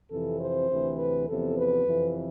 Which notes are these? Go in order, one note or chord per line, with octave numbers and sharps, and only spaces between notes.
F2 C3 E3 A4
C5
D2 C3 E3
B4
E2 C3 F3 A4
B4
F2 C3 E3